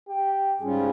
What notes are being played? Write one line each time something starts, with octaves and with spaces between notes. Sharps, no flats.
G4
G#2 G3 C#4 F4 G#4